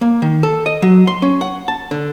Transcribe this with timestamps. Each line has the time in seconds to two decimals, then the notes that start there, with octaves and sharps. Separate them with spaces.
0.01 A#3
0.22 D#3
0.43 A4
0.66 D#5
0.82 F#3
1.07 C6
1.22 C#4
1.41 F#5
1.68 A5
1.91 D3